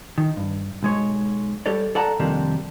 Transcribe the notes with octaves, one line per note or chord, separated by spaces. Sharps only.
D#3
G2
B1 G#3 C#5
G3 G4 A4 C#5 D5
A4 D5 F#5 A5 A#5
F2 C3 D#3 G3 A#3 D4